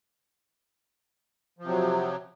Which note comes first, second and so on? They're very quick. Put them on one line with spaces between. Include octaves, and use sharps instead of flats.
F3 C3 F#3